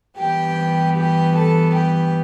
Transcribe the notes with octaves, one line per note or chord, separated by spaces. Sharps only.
G2 E3 B3 G4 G5
G4 G5
A4 A5
G4 G5